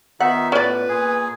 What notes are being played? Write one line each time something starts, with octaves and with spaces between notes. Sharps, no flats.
D#3 B3 D#4 F4 E5 F#5
A2 C#4 B4 D5
A#2 G#4